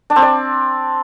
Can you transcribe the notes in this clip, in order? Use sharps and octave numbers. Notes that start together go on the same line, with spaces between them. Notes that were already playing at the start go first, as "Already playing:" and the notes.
D4
C4
D5